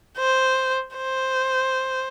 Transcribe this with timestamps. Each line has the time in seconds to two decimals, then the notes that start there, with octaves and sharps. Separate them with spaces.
0.18 C5
0.96 C5